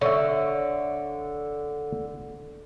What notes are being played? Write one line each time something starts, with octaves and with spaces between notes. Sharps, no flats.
D3 C#5 E5